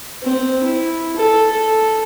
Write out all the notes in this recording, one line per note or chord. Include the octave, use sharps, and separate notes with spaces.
C4
E4
A4
A4